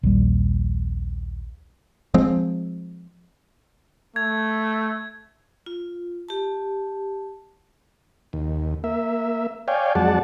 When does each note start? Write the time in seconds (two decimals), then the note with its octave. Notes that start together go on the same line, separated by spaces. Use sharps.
0.03 A#1 D#2 G3
2.14 F3 G#3 C4
4.16 A3 G#6
5.66 F4
6.29 G4 A5
8.33 D#2
8.84 A#3 E5
9.68 C#5 D5 F5 G5 G#5
9.95 F2 F#3 G#3 D5 F#5 A5